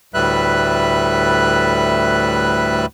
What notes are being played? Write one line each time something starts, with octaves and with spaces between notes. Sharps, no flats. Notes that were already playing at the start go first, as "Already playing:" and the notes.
D2 A2 G3 B4 E5 F#6